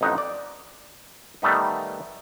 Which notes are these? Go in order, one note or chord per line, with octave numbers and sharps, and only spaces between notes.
A1 F2 D#4 F#5
D5
D#3 G3 A3 B3 D#4